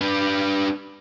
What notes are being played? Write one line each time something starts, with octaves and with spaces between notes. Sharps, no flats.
D4 B4